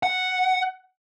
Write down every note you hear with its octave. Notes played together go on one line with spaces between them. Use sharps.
F#5